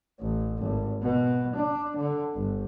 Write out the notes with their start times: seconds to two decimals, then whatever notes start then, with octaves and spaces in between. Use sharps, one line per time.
0.20 A1
0.58 G#1
1.02 B2
1.56 D4
1.97 D3
2.35 G1